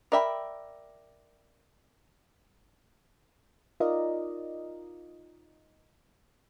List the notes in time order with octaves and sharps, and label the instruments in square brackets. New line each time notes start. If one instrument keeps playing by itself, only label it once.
[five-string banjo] A#4 D5 E5 G5 B5
[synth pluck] D#4 F4 A#4 D5 D#5